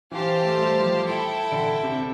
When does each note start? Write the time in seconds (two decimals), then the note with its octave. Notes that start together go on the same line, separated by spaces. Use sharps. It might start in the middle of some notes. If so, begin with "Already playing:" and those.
0.11 E3 G4 C5 F5 A5
0.43 A3
0.58 G3
0.82 F3
1.05 E4 A4 E5 G5
1.52 D3
1.83 C3